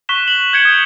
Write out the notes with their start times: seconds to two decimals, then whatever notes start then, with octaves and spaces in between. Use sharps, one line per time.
0.09 C#6 F#6 B6 E7 G7
0.28 F#7
0.53 G6 G#6 C#7 D7 F#7
0.65 D#6